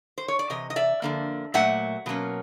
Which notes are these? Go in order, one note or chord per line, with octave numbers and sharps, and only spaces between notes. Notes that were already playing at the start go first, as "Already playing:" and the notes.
C5
C#5
D5
C3 E3 D#5
D#5
D5 E5
F2 D3 F3 A#3
A#2 F#3 A3 E5 F#5
B2 F#3 A#3 C#4